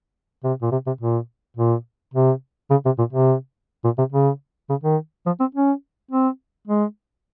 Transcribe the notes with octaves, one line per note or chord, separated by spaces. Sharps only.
C3
A#2
C3
C3
A#2
A#2
C3
C#3
C3
A#2
C3
A#2
C3
C#3
C#3
D#3
F3
C4
C#4
C4
G#3